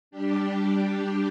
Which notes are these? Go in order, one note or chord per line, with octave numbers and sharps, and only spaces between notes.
G3 D4 G4